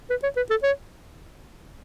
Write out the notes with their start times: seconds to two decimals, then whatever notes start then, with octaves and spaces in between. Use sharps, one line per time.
0.10 B4
0.23 C#5
0.37 B4
0.50 A4
0.63 C#5